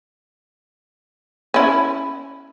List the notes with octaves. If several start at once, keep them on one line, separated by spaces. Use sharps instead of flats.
C#4 E4